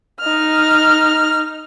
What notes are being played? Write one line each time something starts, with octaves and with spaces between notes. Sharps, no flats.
D#4 F6